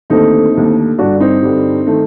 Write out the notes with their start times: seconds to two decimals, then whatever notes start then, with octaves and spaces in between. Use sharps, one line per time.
0.10 D#2 D3 A3 C4 D#4
0.54 D#2 D3 A3
0.98 G2 D3 G3 D4 F#4
1.20 C4 D#4
1.42 G2 D3 G3
1.87 D#3 A3